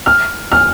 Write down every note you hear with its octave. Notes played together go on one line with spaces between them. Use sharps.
F6
F6